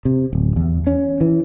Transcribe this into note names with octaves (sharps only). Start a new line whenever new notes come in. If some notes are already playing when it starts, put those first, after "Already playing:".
C3
D1
E2
C#4
E3